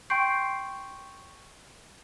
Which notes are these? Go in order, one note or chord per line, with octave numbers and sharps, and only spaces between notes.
G5 C6 C#6 G6 C7 D7